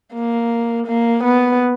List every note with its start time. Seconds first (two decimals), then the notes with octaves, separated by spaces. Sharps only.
0.14 A#3
0.87 A#3
1.24 B3